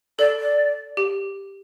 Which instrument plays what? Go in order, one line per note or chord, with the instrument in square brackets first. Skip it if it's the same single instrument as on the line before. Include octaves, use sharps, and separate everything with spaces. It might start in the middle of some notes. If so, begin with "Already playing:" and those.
[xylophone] A4 [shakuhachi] D5
[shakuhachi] D5
[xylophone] G4